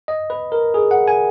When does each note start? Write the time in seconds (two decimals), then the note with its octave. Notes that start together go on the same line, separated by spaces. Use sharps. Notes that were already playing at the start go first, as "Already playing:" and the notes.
0.08 D#5
0.30 B4
0.52 A#4
0.74 G#4
0.91 F#5
1.08 G#5